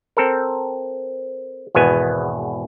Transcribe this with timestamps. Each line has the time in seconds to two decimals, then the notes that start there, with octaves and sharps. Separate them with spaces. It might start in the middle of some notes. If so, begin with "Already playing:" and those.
0.17 C4 A4 A#4
1.75 G#1 E2 B2 B3 G#5